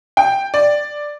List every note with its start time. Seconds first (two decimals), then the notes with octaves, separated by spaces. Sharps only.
0.17 G5
0.54 D5